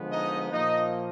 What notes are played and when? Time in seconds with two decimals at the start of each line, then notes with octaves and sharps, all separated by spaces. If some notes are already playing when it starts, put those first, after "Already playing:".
Already playing: D3 F3 G#3 B3
0.10 D#4 D#5
0.51 A#2 F3 A#3 D#4 D#5